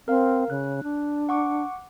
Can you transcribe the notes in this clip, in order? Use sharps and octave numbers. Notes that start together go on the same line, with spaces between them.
C4 A#4 F5
C#3 F#6
D4
F#5 C#6 D6